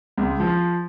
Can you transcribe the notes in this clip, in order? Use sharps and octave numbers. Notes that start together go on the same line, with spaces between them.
C#2
F3